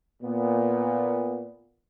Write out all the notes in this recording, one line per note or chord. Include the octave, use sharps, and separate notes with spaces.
A#2 B3